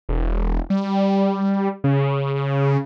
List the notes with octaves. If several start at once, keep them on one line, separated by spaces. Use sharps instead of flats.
E1
G3
C#3